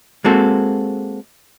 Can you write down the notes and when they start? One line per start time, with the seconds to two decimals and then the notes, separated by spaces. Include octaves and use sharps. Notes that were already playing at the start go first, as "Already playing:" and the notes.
0.25 G#3 A#3 C4 F#4 A4